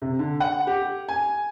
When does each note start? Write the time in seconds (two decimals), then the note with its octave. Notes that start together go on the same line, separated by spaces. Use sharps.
0.02 C3
0.19 D3
0.40 F#5
0.67 G4
1.08 G#5